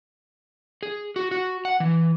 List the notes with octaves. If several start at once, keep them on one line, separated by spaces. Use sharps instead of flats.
G#4
F#4
F#4
F#5
E3